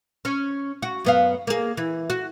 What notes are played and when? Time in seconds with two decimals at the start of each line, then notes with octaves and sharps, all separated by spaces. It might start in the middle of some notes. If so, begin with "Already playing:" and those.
0.25 C#4
0.82 F#4
1.05 F#2 B3 F5
1.47 A#3 G#4
1.77 E3
2.10 F#4